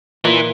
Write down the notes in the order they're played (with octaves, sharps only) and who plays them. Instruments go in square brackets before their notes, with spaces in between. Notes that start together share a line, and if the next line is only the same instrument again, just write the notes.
[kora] A#2 [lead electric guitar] E3